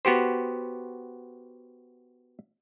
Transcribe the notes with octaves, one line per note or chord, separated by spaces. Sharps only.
B3 F#4 G4 C5